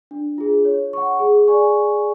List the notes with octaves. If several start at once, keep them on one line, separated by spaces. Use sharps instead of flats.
D4
F4 G#4
C#5
F#5 C#6
G#4
D5 G#5 C#6